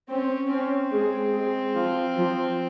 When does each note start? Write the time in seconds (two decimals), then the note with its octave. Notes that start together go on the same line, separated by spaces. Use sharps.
0.09 C4 C#4
0.50 C4 C#4
0.92 G#3 G#4
1.33 G#3 G#4
1.75 F3 F4
2.16 F3 F4